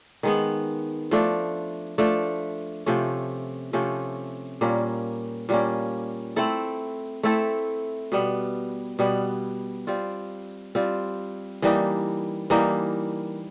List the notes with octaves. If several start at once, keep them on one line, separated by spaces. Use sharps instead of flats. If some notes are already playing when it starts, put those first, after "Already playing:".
D#3 G#3 B3
F3 A3 D4
F3 A3 D4
C3 F3 A3 C#4
C3 F3 A3 C#4
A#2 G3 A#3 C#4
A#2 G3 A#3 C#4
A3 C4 E4 A4
A3 C4 E4 A4
B2 G3 B3
B2 G3 B3
G3 C4 F4
G3 C4 F4
E3 G3 A#3 D#4
E3 G3 A#3 D#4